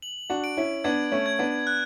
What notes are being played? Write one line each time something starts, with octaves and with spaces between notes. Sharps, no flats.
F#7
D4 F#4
D7
C#4 E4
B3 D4 G#6
A3 C#4
G#6
B3 D4
F#6